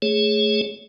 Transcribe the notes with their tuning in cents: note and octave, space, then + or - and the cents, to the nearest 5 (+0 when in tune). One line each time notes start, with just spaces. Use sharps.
A3 +0 G#4 +0 C#5 +0